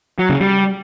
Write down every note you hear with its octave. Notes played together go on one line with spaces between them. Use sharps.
F#3
C#3
G3